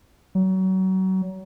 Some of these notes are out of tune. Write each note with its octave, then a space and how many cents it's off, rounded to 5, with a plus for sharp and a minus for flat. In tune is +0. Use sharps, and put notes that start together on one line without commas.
F#3 +30